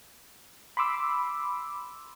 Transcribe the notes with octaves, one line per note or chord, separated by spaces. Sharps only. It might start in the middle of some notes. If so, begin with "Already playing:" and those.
B5 C6 D6 E6